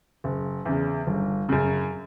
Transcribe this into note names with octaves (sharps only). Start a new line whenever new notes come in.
F#1
E2 C#3
G1
F#2 C#3